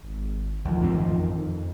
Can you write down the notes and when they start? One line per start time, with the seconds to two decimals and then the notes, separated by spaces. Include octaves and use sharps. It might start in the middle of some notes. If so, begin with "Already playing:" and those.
0.03 G#1
0.65 A1 D2 D#3 F3
0.81 F2 G#2 C4
1.19 F2